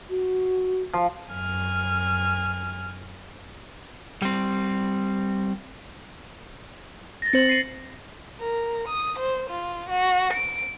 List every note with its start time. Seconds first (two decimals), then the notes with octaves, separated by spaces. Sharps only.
0.10 F#4
0.93 F3
1.32 F#2 G#5 F6
4.22 G3 C4
7.22 A6 A#6
7.33 C4 C5 C#7 F#7
7.49 C7 D#7
8.39 A#4
8.88 D#6
9.19 C5
9.49 F4
9.89 F#4
10.33 D7